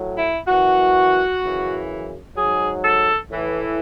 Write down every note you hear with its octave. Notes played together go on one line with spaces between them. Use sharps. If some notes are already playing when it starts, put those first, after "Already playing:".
Already playing: A2 F#3
E4
F#2 E3 F#4
F#2 C#3 E3
G#2 F#3 G#4
A4
A2 E3